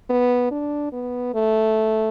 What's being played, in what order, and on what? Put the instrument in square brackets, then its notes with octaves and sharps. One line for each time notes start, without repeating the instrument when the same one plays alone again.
[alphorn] B3
D4
B3
A3